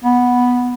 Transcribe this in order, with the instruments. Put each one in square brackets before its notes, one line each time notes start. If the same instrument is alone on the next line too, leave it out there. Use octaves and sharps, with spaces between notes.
[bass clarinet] B3